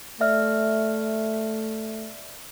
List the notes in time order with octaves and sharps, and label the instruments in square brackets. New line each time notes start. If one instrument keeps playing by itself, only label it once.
[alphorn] A3 [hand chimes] D5 E5 F6